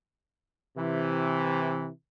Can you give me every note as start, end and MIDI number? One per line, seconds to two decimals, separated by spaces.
0.77 1.88 48
0.77 1.88 52